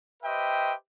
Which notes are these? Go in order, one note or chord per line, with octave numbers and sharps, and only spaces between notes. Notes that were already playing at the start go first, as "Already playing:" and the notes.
G4 B4 C5 D#5 E5 G5